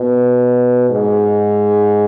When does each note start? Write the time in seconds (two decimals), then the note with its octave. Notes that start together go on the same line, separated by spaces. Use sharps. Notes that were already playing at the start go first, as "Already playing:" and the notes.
Already playing: B2
0.89 G#2